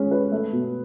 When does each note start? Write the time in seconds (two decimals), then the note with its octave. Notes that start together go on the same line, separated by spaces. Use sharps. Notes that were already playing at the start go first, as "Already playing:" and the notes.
Already playing: G#3 C#4
0.11 B4
0.32 A3
0.52 B2